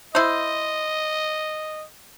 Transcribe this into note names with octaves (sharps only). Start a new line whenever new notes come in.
E4 C5 D#5